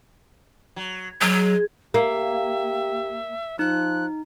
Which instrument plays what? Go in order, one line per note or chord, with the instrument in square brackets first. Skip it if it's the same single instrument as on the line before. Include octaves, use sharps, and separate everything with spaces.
[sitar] F#3
[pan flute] F#3 [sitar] G#3
[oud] A#3 [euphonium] G4 [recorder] E5
[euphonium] F3 [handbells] D#4 [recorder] F#6